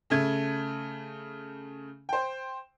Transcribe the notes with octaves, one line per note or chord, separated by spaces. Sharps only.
C#3 A3 G#6
C5 G5